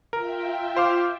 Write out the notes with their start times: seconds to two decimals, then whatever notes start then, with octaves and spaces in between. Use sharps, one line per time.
0.13 F4 A#4 E5 G5
0.76 C5 F5 D6